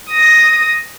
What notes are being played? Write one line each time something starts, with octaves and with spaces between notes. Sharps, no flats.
D#6 A#6